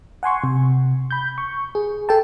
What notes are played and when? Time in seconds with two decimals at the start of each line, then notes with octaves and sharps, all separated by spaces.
0.23 F#5 G#5 C6 C#6
0.44 C3
1.11 B5 G6
1.38 C#6
1.75 G#4
2.09 A4 G5 A5